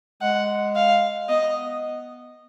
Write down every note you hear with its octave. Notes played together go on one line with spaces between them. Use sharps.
G#3 F#5
F5
B3 D#5